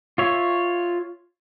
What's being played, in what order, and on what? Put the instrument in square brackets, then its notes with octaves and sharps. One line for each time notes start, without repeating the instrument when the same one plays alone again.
[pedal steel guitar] F4 C#5 E5